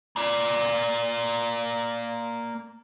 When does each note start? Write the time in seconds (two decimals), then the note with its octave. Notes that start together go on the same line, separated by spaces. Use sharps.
0.16 A#3 D5